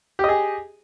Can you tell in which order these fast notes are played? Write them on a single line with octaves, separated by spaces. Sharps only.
G4 D#5 G#4